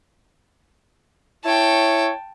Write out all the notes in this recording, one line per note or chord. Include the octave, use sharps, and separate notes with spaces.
E4 C#5 G5 A5